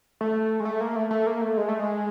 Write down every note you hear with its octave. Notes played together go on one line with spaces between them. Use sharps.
A3
G#3
A3
A#3
A3
A3
A#3
A3
G#3
A3
G#3